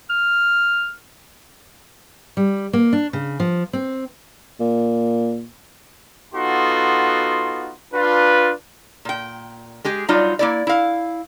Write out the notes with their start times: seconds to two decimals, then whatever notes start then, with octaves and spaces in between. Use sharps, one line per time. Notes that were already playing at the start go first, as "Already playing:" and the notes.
0.10 F6
2.37 G3
2.73 A#3
2.93 D4
3.13 C#3
3.40 F3
3.73 C4
4.60 A#2
6.34 B3 D#4 F4 F#4 A4 C6
7.93 D4 F4 B4
9.05 A#2 G5
9.84 G#3 G4 G#4
10.09 F#3 G3 D#4 F4 D5
10.39 A#3 E4 D5
10.67 E4 F5